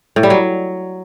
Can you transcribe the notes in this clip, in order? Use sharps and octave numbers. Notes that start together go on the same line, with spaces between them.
A2
G3
F#3